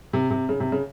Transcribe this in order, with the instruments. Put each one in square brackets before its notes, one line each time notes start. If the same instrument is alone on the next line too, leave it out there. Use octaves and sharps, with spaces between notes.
[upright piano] C3
C3
C#3
C3
C#3